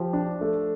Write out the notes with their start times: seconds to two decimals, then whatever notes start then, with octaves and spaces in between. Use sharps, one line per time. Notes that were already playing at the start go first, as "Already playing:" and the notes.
Already playing: F3 G4
0.13 D4
0.41 A3